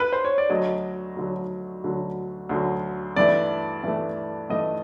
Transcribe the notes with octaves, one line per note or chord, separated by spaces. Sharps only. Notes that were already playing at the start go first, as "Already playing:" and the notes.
B4
C5
C#5
D5
D2 D3 F#3 D#5
D2 D3 F#3
D2 D3 F#3
D2 D3 F#3
G2 E3 A3 D5
G2 E3 A3
G2 E3 A3 D#5